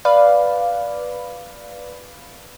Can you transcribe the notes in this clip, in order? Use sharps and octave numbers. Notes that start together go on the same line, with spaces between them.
B4 D5 F5